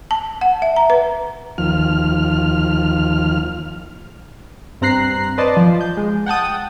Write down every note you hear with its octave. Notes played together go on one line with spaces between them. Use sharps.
A5
F#5
E5
A#5
B4
D#2 F3 F6
G2 C4 A#5 F#6 C7
B4 C5 D5 D#5 A5
F3
G6
G#3
F#5 G5 A5 D#6